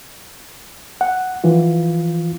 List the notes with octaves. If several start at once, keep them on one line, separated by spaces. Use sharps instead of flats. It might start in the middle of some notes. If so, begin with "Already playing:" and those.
F#5
E3 F3 F4